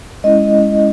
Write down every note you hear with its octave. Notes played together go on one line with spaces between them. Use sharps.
G#3 C#4 E4 D#5